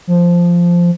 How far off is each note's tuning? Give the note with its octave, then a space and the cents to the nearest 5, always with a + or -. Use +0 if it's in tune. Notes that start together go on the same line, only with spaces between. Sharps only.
F3 -5